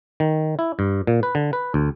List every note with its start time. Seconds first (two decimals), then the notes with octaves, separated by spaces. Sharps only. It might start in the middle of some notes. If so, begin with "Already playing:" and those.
0.20 D#3
0.59 E4
0.79 G2
1.07 A#2
1.23 B4
1.35 D3
1.53 B4
1.74 D2